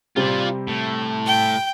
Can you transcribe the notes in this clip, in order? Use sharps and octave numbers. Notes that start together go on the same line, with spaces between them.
C3 G3 F4 C5 D5
A2
G5